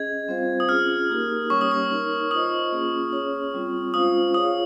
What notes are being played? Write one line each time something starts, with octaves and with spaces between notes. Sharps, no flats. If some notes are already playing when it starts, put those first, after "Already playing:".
Already playing: C#4 G#4 D#5 G#6
G3 C4 F4 C5 F5
D#6
C#4 F4 G#4 F6
A#3 D#4 G4 A#4
G3 A#3 C#4 G4 C#5 C#6
D#6
C#6
D#4 A#4 C#5
F4 C5 D#5 D#6
A#3 C#4 F4 G#4
C#4 G#4 C#5
G3 C4 F4
G#3 C#4 F4 C5 F5 D#6
F4 G#4 C#5 F5 D#6